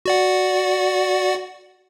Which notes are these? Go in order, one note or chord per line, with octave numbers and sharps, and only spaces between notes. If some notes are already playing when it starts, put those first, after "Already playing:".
F#4 D5 F#5